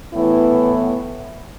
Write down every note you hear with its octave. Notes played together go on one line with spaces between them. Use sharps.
A2 E3 B3 E4